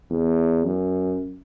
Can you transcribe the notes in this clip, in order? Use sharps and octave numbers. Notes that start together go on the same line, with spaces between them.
E2
F#2